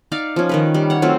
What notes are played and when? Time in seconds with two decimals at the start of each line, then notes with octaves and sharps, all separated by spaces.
0.12 D#4 D5 F5
0.36 F3 C#4
0.49 D#3 A#4 B4
0.74 G3
0.90 C#5 F#5
1.02 F#3 A3 C4 F4